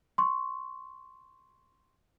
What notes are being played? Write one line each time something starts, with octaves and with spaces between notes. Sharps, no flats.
C6 C#6